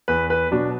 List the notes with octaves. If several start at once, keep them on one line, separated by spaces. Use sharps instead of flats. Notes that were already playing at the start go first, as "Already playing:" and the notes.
E2 B4
B4
B2 F#3 D4